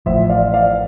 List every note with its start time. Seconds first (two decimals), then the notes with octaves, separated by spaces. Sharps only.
0.06 A1 A2 F3 C5 E5
0.29 D5 F5
0.53 D5 F5